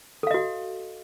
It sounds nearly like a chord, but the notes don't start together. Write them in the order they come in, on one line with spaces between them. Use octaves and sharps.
A4 F5 D#5 F#4